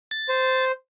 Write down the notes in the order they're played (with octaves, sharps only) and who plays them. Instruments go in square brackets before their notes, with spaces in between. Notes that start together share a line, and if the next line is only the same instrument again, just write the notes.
[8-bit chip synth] A6
[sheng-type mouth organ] C5